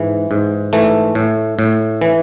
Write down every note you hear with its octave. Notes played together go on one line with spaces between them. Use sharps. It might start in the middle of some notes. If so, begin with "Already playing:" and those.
Already playing: G#2 E3
G#2
E3 A3
A2
A2
E3